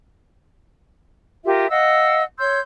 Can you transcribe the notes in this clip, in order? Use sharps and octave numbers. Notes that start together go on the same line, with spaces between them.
F4 G4 A#4 E5
D#5 F5 F#5 E6
C#5 C6 E6 G6